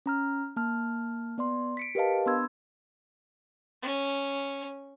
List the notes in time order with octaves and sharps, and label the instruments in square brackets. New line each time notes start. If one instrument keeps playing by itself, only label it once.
[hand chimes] C#4 A#5 F6
A#3 A5 F6
B3 D5 C6
B6 C#7 D7
G4 A#4 B4 D#5 F5 A5
B3 D4 B5 C6 E6 G#6
[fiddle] C#4